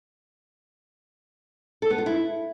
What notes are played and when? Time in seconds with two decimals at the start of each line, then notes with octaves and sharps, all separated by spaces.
1.82 A4
1.90 B3
1.98 F4
2.06 E4